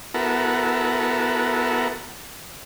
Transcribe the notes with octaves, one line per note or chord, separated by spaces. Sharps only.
B3 E4 F#4 A4 A#4